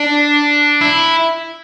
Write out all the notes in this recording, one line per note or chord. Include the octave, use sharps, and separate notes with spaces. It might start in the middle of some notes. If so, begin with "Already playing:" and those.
Already playing: D4
E4